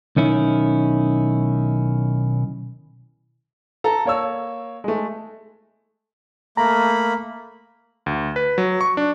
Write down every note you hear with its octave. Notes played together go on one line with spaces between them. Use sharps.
B1 D#3 C#4 E4
A4 A#5
A#3 C#5 E6
G#3 A3
A3 A#3 A#5 B5
D2
B4
F#3
C#6
D4